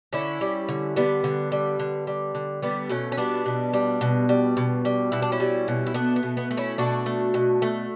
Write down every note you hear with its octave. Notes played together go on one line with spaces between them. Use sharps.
D3 C#4 E4
G3
D3
G3 B3
D3
G3
D3
G3
D3
G3 B3
B2 A3 C#4
C#4
G3 B3 D4
B2
G3
B2
G3
B2
G3
B2 E4
D4
C#4 E4
G3
B2
E4
A3 B3 D4
B3
B2
B3
A3
C#4 E4
B2 D4 F#4
A3
B2
A3